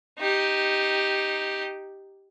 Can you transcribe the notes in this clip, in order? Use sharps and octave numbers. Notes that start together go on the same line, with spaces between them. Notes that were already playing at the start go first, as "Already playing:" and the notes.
D#4 G4